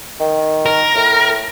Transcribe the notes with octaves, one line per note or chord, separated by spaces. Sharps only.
D#3
A#4
A2